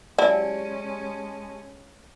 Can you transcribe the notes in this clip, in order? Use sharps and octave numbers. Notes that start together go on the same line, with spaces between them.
F#3 G#3 C#4 E4 G4 D5 G#5 A5